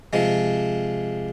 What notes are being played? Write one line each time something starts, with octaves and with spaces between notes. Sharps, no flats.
C3 F3 G#3